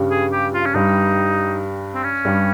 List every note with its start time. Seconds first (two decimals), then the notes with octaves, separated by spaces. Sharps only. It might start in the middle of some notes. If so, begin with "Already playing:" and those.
Already playing: G2 C#3 G3
0.10 G#4
0.32 G4
0.54 F4
0.66 C#4
0.74 G2 G3 D#4
1.94 C4
2.04 C#4
2.25 G2 G3